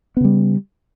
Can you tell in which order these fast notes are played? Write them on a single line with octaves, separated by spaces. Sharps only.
B3 C#3 G3